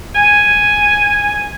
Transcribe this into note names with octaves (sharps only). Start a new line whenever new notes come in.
G#5